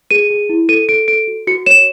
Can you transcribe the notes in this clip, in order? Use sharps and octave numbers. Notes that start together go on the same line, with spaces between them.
G#4 D#7
G#4
E4
A4 D#7
A4 D7
A4 D7
F#4
F#4 C#7
C#5 E7